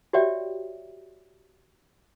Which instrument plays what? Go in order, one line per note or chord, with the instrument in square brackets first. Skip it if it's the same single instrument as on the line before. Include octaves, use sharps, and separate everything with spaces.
[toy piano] F#4 G4 C#5 D5 E5 G5